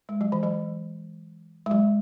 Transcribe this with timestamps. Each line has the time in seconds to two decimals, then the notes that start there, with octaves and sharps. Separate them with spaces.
0.09 G#3
0.21 F#3
0.32 E3
0.43 F#3
1.66 G#3
1.71 F#3